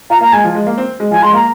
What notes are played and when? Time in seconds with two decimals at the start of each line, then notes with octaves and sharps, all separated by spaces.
0.10 F4 A#5
0.21 A#3 A#5
0.32 G#3 G#5
0.44 F3
0.55 G#3
0.67 A#3
0.78 C4
1.00 G#3
1.11 F3 G#5
1.22 G#3 C6
1.33 A#3 A#5